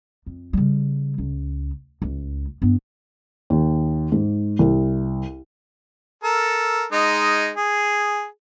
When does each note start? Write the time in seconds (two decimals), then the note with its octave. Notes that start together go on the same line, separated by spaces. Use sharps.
0.26 F2
0.53 C#3 G3
1.18 C#2
2.02 C#2
2.62 G2 B3
3.50 D#2
4.12 G#2
4.59 C2
6.24 A4 A#4
6.92 G#3 D#4
7.57 G#4